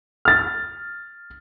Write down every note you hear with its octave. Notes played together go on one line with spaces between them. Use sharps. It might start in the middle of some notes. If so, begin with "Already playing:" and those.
F6 A6